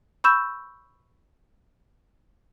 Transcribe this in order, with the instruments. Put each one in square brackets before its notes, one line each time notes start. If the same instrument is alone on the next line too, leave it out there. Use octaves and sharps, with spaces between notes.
[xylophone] B5 C#6 E6 G6 E7